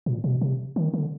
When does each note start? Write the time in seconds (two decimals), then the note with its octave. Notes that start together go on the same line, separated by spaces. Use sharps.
0.06 A#2
0.24 B2
0.41 C3
0.76 D#3
0.94 D3